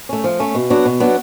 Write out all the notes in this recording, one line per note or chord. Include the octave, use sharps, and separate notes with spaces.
A3 C#4
F3
A3 C#4
B2
F#3 B3 D4 F#4
B2
F#3 B3 D4 F#4